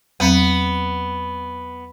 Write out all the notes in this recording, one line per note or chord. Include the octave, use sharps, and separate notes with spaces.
E2 F#3 B3 C4